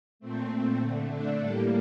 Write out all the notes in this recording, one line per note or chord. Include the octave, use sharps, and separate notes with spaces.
A#2 A3 C4
D3 A3
D4
A2 G3 A#3 A4